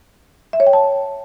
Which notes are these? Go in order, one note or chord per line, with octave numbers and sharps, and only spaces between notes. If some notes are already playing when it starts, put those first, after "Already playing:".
E5
C#5
G5
A5